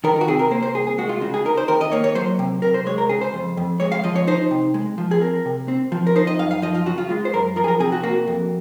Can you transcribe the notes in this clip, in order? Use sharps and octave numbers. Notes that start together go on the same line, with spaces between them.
D#3 A#4
A#4
F#4
C3 G#4
A#4
A#3 C5
C5
C2 G#4
G#4
G#3 F#4
F4
C#3 F#4
G#4
D#4 A#4
C5
D#2 A#4
D#5
A#3 C#5
C#5
F#3 C5
C3
C3 A#4
C5
G#3 C#5
A#4
C#3 G#4
C5
F2
F2
G#3 C#5
F5
F3 D#5
C#5
D#4 C5
C3
G#3
F3
G#4
C4 A#4
C3
C4
F3
A#4
D#4 C5
D#5
F#2 F5
F5
F3 D#5
F4
C#3 F#4
F4
G#3 F4
C5
F#2 A#4
F3 A#4
G#4
A#4
C3 G#4
F#4
A#3 F#4
F2